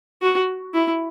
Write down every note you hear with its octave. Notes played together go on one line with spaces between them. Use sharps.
F#4
E4